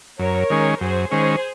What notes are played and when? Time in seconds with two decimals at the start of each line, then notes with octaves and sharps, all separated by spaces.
0.19 F#2 A#4 C#5
0.50 D#3 G#3 C#4
0.81 F#2 G#4 C5
1.11 D#3 G#3 C#4 G#4 C5